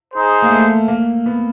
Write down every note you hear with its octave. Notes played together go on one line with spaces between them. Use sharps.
D#4 G#4 C5
A#3
A3
A#3
B3